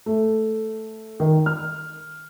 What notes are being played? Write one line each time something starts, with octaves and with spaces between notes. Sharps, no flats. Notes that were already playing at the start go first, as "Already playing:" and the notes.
A3
D#3
F6